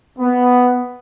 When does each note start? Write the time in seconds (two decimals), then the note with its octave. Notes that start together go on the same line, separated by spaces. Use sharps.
0.19 B3